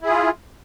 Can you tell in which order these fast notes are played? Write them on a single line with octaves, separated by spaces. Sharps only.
E4 G#4 F4